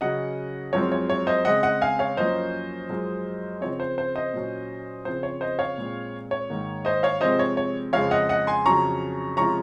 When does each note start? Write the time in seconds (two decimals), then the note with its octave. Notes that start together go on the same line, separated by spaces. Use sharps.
0.01 C#3 F#3 C#4 D#5 F#5
0.73 F#2 F3 G#3 C4 C#5
0.92 C#5
1.10 C#5
1.27 C5 D#5
1.45 C#3 G#3 C4 D#5 F#5
1.63 D#5 F#5
1.81 F5 G#5
1.99 C#5 F5
2.17 F#2 F3 A#3 C#4 C5 D#5
2.89 F#2 F3 G#3
3.61 C#3 F3 C4 C#5
3.80 C5
3.98 C5
4.16 C5 D#5
4.33 A#2 F#3 C#4
5.05 C#3 F3 C4 C5
5.23 C#5
5.41 C5 D#5
5.59 C#5 F5
5.78 A#2 G#3 C4
6.31 C#5
6.50 G#2 D#3 A#3
6.85 C5 D#5
7.03 C#5 F5
7.21 C3 F3 G#3 C4 C5 D#5
7.39 C#5
7.57 C#5
7.93 F2 C#3 G#3 C4 C#5 F5
8.11 D#5 F#5
8.29 D#5 F#5
8.47 G#5 C6
8.65 F2 C#3 F#3 C#4 A#5 C#6
9.37 C3 F3 G#3 C#4 A#5 C#6